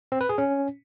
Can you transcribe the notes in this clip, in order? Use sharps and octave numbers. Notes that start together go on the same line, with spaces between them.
C4
B4
G#4
C#4